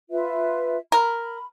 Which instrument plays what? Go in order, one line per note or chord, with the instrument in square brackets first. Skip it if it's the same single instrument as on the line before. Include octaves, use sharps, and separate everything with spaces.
[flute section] F4 B4 E5
[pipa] A#4 [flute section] B5